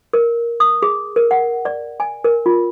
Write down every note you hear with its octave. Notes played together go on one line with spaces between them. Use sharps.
A#4
D#6
G#4
A#4
F#5
D5
G#5
A#4
F4